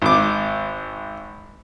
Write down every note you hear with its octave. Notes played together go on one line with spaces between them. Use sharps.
G#1 D6